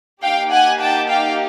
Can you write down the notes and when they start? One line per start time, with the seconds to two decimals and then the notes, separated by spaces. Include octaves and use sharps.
0.22 A#3 D#4 G4 F5 G5
0.51 F#5 G#5
0.80 G5 A5
1.09 F5 G5